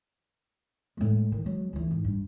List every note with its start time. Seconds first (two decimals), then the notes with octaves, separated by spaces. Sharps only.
0.97 A2 G#3
1.32 D#3
1.44 F#3 G#3
1.73 D2 E3
1.91 G#2
2.04 G2